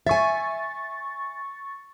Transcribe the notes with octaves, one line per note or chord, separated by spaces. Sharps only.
E5 G#5 C#6 A6